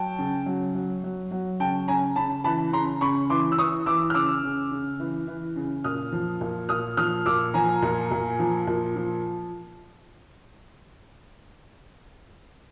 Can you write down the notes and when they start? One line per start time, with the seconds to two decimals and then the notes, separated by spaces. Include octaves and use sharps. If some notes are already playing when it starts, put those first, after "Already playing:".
Already playing: F#3 G5 A5
0.18 C#3
0.46 F#3
0.75 F#3
1.04 F#3
1.31 F#3
1.60 C#3 G5 A5
1.88 C#3 G#5 A#5
2.16 C#3 A5 B5
2.44 E3 A5 B5
2.73 C#3 A#5 C6
3.01 C#3 B5 C#6
3.30 E3 C6 D6
3.52 E6
3.58 E3 C#6 D#6
3.86 E3 D6 E6
4.10 F6
4.14 C#3 D6 E6
4.43 C#3
4.71 C#3
5.00 E3
5.27 E3
5.56 C#3
5.84 A#2 D#6 F6
6.12 F3
6.41 A#2
6.69 A#2 D#6 F6
6.97 F3 D#6 F6
7.26 A#2 D6 E6
7.54 F3 G#5 A#5
7.82 A#2
8.11 A#2
8.39 F3
8.67 A#2
8.96 F3